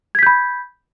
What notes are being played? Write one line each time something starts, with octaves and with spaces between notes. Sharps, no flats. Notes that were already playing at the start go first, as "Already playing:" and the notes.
B5 G6 G#6 B6